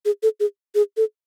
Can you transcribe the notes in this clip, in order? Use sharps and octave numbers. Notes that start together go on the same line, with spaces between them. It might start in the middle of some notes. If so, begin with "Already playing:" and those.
G#4
A4
G#4
G#4
A4